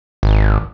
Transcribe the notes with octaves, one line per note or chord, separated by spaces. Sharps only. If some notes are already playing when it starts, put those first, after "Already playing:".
G#1